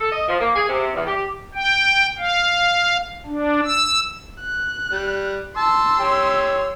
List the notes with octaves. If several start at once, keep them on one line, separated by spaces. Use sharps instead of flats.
A4
D#5
F3
A#3
G#4
C3
E2
G4
G5
F5
D4
E6
F#6
G3
A5 C6 E6
G4 C#5 G5